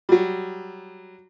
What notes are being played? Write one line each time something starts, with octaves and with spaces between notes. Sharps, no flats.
F#3 G3